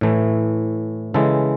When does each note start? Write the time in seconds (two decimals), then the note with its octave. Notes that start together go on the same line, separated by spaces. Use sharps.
0.01 A2 E3 A3
1.14 C#3 E3 G#3 A4